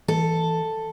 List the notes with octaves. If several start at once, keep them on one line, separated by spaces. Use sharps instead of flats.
E3 A4